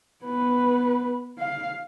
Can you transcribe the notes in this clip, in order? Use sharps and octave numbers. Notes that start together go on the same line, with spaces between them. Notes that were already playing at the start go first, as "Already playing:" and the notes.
B3 B4
F5